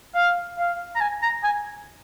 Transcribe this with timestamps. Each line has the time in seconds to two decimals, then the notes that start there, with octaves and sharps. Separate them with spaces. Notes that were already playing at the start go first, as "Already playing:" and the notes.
0.15 F5
0.58 F5
0.95 A#5
1.00 G#5
1.22 A#5
1.44 G#5